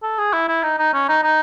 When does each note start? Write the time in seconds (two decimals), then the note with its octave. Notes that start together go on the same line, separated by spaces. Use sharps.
0.03 A4
0.19 G#4
0.33 E4
0.48 E4
0.63 D#4
0.79 D#4
0.94 C#4
1.09 D#4
1.24 D#4